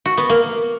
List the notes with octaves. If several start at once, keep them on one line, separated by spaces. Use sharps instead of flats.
F#4
B3
A#3